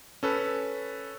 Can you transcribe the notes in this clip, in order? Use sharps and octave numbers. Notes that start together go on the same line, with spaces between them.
C#4 A4 B4